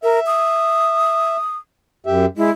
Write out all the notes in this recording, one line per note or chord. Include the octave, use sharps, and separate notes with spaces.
A#4 E5
D#6
F#2 G4 E5
G#3 E4